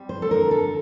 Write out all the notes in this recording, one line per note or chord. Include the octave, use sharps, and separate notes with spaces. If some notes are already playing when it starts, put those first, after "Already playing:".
Already playing: G3 C4
C5
A4
D3 A#4
A4